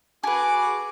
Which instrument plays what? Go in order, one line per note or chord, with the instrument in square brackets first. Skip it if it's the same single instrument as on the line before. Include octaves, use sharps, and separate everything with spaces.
[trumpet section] F#4 D6 [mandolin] G#4 B4